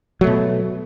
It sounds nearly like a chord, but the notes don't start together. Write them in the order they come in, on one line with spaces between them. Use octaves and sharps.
F#3 A3 B2